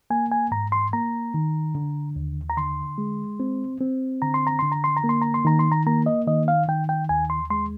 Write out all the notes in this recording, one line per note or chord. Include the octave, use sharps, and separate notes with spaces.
A#3 G#5
G#5
G#2 A#5
C6
A#3 A#5
D#3
D3
D#2
A#5
D3 C6
G#3
C4
C4
D3 A#5
C6
A#5
D3 C6
A#5
C6
A#5
A#3
C6
A#5
C6
D#3 A#5
C6
A#5
A#3 A#5
D#5
D#3 D#5
F5
D#3 G5
G5
D#2 G#5
C6
G#3 C6